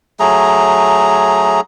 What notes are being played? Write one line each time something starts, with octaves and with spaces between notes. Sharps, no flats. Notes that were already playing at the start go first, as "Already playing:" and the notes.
F#3 A3 G#4 A#5